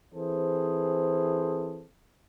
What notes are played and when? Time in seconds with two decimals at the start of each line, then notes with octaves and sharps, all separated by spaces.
0.14 E3 C4 G#4 A4 C5